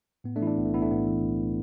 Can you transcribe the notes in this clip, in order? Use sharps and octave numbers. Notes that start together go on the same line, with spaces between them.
A2 B3
A3 D4
E3 E4
A3 D4
B1 B3
A3
B1 B3 E4
A3 D4
A2 B3
E3
B1